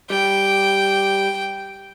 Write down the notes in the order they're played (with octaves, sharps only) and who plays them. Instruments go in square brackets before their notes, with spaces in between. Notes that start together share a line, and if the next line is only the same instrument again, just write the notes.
[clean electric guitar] G3 [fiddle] G5